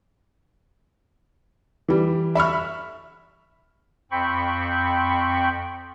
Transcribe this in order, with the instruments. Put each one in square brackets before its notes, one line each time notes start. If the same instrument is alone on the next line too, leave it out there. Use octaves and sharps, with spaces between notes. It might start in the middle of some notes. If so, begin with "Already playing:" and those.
[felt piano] E3 G3
E5 B5 C#6 F6
[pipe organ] F2 C4 G5 B5 C#6